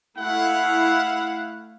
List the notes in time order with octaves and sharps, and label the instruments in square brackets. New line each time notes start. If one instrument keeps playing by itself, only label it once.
[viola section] A3 E4 F5 [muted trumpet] F#5